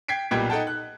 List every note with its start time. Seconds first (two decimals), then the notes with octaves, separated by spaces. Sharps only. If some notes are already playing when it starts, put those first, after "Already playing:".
0.08 G5 G#6 B6 C7 D7
0.31 B1 A#2 G3 B3 G5 G#6
0.50 D#4 A4 F#5 G5 A5
0.67 F#6